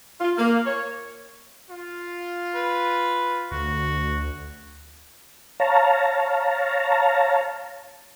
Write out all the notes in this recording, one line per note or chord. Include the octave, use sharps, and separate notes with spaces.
F4
A#3
C#5
F4
B4
D2 F#4
C#5 F5 A5 A#5